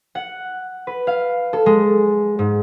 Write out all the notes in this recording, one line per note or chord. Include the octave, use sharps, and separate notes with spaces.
F#5
B4
F5
A4
G#3
G#2